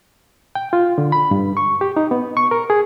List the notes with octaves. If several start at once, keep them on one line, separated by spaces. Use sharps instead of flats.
G5
F4
D3
B5
G2
C#6
G4
D#4
B3
C#6
A#4
G#4